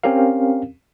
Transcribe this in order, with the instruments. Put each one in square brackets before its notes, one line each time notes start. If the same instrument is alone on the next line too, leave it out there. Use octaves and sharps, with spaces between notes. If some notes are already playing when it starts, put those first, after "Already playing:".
[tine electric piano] C4 C#4 G4 A#4 F5